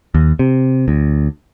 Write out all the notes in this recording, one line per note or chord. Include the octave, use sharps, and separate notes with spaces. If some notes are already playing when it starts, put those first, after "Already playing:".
D#2
C3
D2